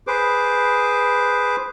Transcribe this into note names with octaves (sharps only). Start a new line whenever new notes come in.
G#4 B4 C5 D6